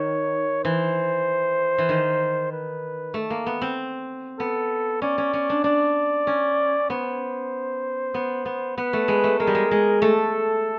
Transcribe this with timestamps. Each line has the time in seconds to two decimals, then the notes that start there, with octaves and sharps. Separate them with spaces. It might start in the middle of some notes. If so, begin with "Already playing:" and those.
Already playing: D#3 C#5
0.64 E3 C5
1.78 E3
1.89 D#3
2.52 B4
3.14 A3
3.30 A#3
3.46 B3
3.61 C4
4.39 B3 A4
5.02 C#4 D5
5.18 C#4
5.33 C#4
5.50 D4
5.64 D4 D5
6.27 C#4
6.90 B3 C5
8.14 B3
8.45 B3
8.77 B3 B4
8.93 A3
9.08 G#3
9.24 A3
9.40 G#3 A#4
9.47 G3
9.55 G#3
9.71 G#3
10.02 A3 A4